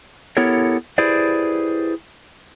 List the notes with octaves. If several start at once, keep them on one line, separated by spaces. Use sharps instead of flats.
B3 E4 G4 A4 A#4 C#5
E4 G4 G#4 B4 C5 D5